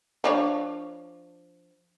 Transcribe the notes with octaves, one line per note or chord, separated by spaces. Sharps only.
F3 D4 C#5